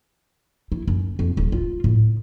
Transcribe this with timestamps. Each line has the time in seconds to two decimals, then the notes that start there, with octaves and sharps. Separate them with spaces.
0.72 E4
0.88 F#2
1.19 F2
1.37 D#1
1.52 F4
1.84 A2